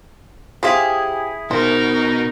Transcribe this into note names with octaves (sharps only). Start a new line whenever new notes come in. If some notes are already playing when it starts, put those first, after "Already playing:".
E4 G4 G#4 C5 F5
B2 D#4 A#4 C5